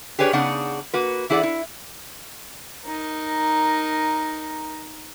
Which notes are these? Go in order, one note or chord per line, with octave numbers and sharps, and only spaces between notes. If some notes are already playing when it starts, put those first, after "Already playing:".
G4 G#4 B4 C#5 D5
C#3 B3 D4 D#4 G#4 F#5
A#3 F#4 B4
E3 E4 G#4 B4 D5 F#5
E4
D#4 A#4